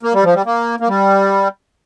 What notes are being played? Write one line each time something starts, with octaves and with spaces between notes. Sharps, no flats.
A#3
G3
F3
G3
A#3
A#3
G3